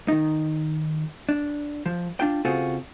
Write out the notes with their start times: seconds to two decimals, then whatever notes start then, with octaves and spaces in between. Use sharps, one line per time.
0.08 D#3 D#4
1.29 D4
1.86 F3
2.20 D4 F4 G5
2.45 C#3 C4 F4 F#4 G#4 A4